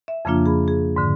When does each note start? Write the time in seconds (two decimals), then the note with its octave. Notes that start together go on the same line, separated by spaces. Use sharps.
0.08 E5
0.25 F2 C#3 F3 A#3 D4 F4
0.46 G#4 B5
0.68 G#4
0.96 G#2 D3